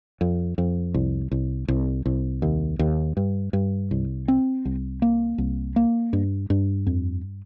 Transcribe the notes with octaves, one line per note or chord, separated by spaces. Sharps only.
F2
F2
C2
C2
C2
C2
D#2
D#2
G2
G2
C2
C4
C2
A#3
C2
A#3
G2
G2
F2